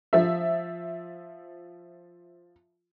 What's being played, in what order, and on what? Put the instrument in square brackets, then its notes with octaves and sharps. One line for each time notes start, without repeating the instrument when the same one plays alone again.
[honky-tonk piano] F3 E5